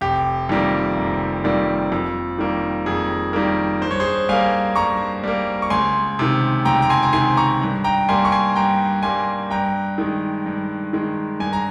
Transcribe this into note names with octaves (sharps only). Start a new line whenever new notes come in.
F1 G4
F2 D#3 G3 A#3
F1
F2 D#3 G3 A#3
F2
D#3 G3 A#3
F2 G#4
D#3 G3 A#3
G2 C5
C#5
G#4 C5
G3 A#3 F5 G#5
G2 A#5 C#6
G3 A#3
C#6
C#2 G#5 C6
C3 D#3
C#2 G5 A#5
A#5
G#5 C6
A#5
C3 D#3 G#5 C6
A#5 C#6
G2
G5 A#5
G3 A#3 G#5 C6
C#6
G#5 C6
G2 G5 A#5
G3 A#3 G#5 C6
G2 G5 A#5
D#3 G#3
G2
D#3 G#3
G2 G#5
A#5